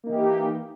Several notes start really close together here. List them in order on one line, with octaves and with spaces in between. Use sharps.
A#3 D#4 E3 G4